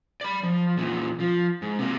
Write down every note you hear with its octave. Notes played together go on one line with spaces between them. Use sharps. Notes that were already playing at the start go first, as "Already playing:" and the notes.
D5 B5
F3
E2 A#2
F3
G#2
C3 A#3